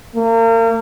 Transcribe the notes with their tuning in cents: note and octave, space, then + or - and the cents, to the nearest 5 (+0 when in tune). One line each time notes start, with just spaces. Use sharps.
A#3 -35